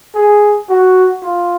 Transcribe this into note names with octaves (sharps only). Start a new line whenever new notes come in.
G#4
F#4
F4